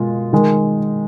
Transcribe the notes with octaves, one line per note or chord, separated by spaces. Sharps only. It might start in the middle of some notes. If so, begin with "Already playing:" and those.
Already playing: B2 G#3 A#3 F4
D#3 G#3